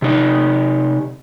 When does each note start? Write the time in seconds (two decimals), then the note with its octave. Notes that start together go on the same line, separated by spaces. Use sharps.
0.02 C3 D#4